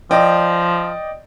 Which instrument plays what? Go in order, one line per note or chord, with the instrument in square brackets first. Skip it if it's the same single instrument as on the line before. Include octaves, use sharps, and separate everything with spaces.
[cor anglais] F3 [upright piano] D5 D#5 G5